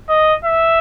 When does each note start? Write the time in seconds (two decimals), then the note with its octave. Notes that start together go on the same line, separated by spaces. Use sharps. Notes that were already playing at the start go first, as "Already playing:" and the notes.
0.09 D#5
0.45 E5